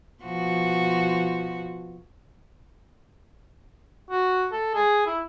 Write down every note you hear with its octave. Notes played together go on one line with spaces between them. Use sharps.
B2 F3 F#4
F#4
A4
G#4
E4